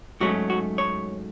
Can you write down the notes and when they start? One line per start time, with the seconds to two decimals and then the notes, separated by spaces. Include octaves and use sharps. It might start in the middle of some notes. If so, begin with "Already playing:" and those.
0.20 G#2 F#3 A3 C#4 F#4
0.50 F#4
0.78 C#5